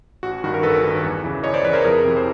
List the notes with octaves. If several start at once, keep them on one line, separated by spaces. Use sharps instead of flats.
A1 F#4
G2 D#3 F#4
A#4
A1 A4 B4
G2 D#3
E2
C#3 E3
E2 C#5 D#5
C5 D5
C#3 E3 B4 C#5
A#4 C5
F2 G#4 A#4
C3 E3
C5